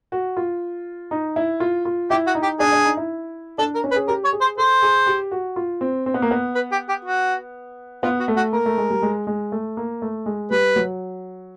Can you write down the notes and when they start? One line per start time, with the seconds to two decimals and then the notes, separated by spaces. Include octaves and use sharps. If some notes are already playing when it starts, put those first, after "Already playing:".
0.12 F#4
0.37 F4
1.11 D#4
1.36 E4
1.60 F4
1.85 F4
2.10 E4 G4
2.27 F#4
2.35 D#4
2.43 G4
2.60 D4 G#4
2.73 D4
2.85 D#4
2.97 E4
3.58 D4 A4
3.75 A#4
3.84 C#4
3.91 B4
3.96 G#4
4.08 G4 A#4
4.25 C#5
4.33 G#4
4.41 C5
4.57 A4 C5
4.82 G#4
5.06 G4
5.31 F#4
5.56 F4
5.81 C4
6.06 C4
6.14 B3
6.22 A#3
6.31 B3
6.55 B4
6.72 G4
6.89 G4
7.05 F#4
8.03 B3 F4
8.20 F#4
8.28 A3
8.36 F#4
8.53 A#3 A#4
8.66 A3
8.78 G#3
8.90 G3
9.02 G#3
9.27 G#3
9.52 A3
9.77 A#3
10.02 A3
10.26 G#3
10.51 G3 B4
10.76 F#3